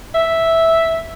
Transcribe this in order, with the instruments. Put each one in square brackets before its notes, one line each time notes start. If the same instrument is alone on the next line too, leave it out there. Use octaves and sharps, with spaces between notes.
[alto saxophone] E5